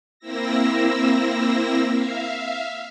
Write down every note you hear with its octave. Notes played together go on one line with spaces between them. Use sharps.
A#3 C4 E4 E6 A#6
E5 F5